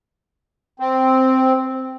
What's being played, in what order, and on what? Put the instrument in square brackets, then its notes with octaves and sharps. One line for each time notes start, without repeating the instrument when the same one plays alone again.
[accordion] C4